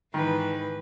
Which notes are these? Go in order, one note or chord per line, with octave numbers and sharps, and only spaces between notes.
G#2 D#3 E3 B4